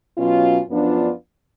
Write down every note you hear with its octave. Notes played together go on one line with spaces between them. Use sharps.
B2 F#3 C#4 F4
F#2 F3 B3 D4 F4